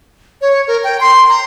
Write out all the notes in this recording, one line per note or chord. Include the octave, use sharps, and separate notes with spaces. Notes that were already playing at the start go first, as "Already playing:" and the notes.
C#5
A#4
G5
C6
A#5